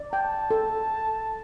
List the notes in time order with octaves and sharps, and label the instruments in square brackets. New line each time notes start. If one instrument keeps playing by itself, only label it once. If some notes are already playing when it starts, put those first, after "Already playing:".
Already playing: [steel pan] D5
[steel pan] G5 [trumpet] A5
[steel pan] A4